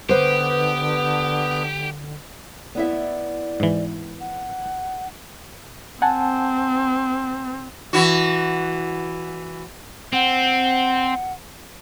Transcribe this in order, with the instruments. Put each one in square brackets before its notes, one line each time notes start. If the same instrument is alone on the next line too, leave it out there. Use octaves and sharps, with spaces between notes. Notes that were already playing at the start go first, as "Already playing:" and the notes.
[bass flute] D3 [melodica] B3 [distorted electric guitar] G4 [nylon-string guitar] B4 C5
[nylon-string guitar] B3 E4 E5 [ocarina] D5
[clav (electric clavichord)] G#2 E3
[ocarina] F#5
[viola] C4 [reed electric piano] F#5 G#5 A5
[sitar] E3 F#4
[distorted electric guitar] C4 [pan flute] F#5